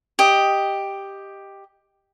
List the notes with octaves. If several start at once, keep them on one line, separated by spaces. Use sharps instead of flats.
G4 D#5